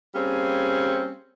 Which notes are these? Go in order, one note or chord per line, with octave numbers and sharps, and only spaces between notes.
G3 A#3 C4 C#4 G#4